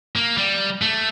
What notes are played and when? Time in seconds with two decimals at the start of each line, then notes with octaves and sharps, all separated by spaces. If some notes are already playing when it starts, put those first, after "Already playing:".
0.16 A#3
0.38 G3
0.82 A3